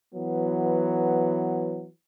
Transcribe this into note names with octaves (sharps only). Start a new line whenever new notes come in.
E3 F#3 B3